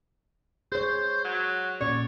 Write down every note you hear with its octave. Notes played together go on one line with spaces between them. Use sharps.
G#4 C5 C#5
F#3
A#2 C#4 C#5 D5